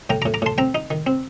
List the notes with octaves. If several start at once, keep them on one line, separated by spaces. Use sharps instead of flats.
A2 G5 A#5
A#5 D6
A2
A#5 D6
A2 A5 C6
C4 G5 A#5
D#4
D#3
C4